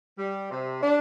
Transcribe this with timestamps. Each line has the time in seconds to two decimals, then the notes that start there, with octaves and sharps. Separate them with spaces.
0.18 G3
0.51 C3
0.82 D4